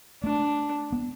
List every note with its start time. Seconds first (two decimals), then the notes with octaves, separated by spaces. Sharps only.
0.23 A3 D4
0.92 B3